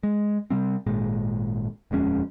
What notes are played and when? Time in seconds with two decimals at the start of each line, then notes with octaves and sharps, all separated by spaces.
0.03 G#3
0.50 C3 G3 C4
0.86 G#1 A#2 G#3
1.91 D#1 F2 G#3 C#4